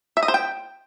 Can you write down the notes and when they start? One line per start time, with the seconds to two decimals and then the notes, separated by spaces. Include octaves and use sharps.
0.17 E5
0.23 D#5
0.28 C5
0.34 G5